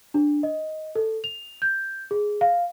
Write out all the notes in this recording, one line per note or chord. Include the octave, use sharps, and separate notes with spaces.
D4
D#5
A4
F7
G6
G#4
F5